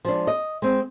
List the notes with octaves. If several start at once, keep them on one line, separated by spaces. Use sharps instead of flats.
F3 G#3 D4
D#5
G#3 C4